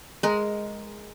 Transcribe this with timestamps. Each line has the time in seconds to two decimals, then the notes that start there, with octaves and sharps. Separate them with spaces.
0.23 G#3 A#4